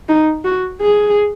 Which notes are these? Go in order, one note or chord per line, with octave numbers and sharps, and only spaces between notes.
D#4
F#4
G#4